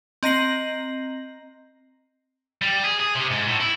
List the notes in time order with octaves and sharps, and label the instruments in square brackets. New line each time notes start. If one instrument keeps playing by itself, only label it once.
[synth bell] C4 D#5 A#5 A#6 C7 F#7
[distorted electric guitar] G3
G#4
G#4
C3
G#2
A2
E4